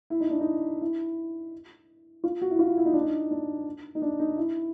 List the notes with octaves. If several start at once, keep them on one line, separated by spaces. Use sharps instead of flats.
E4
D#4
D4
D#4
E4
F4
F#4
E4
F4
E4
D#4
D4
D#4
D4
D#4
D4
D#4
E4